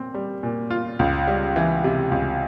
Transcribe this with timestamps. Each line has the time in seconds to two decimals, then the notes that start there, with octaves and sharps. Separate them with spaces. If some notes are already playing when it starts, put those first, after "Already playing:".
Already playing: A#2 C4
0.14 G3
0.43 A#2
0.70 F4
0.99 C#2
1.27 G3
1.56 E3
1.84 C3
2.12 C#2